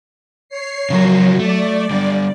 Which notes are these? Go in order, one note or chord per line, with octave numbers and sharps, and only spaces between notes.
C#5 C7
C#3 F3 F#3 A#4
A3 D5
D3 G3